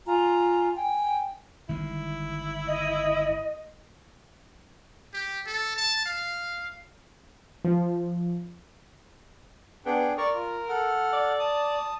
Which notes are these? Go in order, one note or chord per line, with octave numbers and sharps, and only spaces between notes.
F4 G#5 A#5
G5 G#5
G1 D#3 G#3 E4
D#5
G4
A4
A5
F5
F3
B3 D4 G#4 G5
A#4 D5 C#6
F4
A4 F#5 F6
D5
A5 D#6